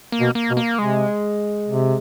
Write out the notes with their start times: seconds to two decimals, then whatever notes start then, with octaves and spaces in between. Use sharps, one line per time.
0.12 A#3
0.20 B2
0.35 A#3
0.50 B2
0.57 A#3
0.79 C3 G#3
1.68 C3